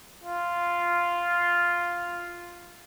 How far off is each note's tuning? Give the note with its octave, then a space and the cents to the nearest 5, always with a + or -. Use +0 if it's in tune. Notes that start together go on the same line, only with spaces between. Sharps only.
F4 -5